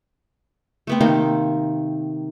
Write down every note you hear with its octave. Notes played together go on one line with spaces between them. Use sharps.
A3 B3 C4
C3 D#3 A#3